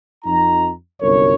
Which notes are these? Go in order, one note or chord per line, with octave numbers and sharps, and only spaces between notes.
F2 D#4 A#5
G1 C2 F#2 A#4 C#5